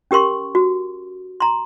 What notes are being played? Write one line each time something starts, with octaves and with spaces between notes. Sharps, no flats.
C#4 G4 A#4 C6 C#6
F#4
A#5 C6